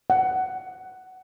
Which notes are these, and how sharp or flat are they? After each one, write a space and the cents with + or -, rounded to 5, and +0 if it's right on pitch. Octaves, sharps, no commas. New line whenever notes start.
F#5 +15